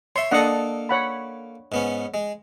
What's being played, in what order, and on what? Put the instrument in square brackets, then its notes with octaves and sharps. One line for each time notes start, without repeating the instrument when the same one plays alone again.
[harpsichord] C#5 E5 [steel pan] C6
[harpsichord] A#3 A4 [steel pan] D4 D#5 F#5
[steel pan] C#5 F#5 B5
[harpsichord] G#2 B3 C#4
G#3